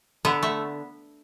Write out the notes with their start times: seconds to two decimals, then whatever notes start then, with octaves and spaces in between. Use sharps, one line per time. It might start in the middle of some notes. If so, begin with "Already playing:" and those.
0.25 D3 B3
0.43 A3